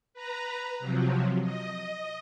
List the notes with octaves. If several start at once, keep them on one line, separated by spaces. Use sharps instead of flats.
B4 A#5
C3 F3 F#3
D#5